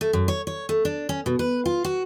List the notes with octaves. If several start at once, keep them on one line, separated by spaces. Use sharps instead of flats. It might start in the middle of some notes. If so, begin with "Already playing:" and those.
A3
F#2
C#5
C#5
A3
D4
C#4
B2
B4
F4
F#4